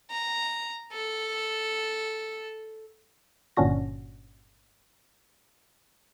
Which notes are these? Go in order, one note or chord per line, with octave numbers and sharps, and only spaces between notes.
A#5
A4
G1 A#2 C#4 D4 F#4 A#6